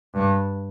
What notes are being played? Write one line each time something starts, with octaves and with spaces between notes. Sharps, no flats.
G2